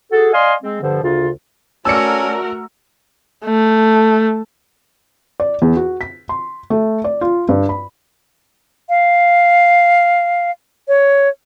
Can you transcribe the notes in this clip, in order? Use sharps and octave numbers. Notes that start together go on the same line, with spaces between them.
F#4 G#4 A4
D5 D#5 F5 G#5 C6
G#3 C4
G2 D3 F3
D2 C#3 D4 F4
A3 C#4 F#4 A#4 D5 A5 E6 C#7
A3
D5
E2
F#4
B6
C6
A3
D5
F4
G2
B5
F5
C#5